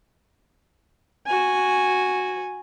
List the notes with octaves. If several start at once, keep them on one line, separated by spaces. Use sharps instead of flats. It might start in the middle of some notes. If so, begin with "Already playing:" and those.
F#4 G#5